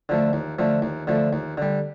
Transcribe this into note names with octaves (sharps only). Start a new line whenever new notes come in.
D3 F3 A3
D#2
D3 F3 A3
D#2
D3 F3 A3
D#2
D3 G3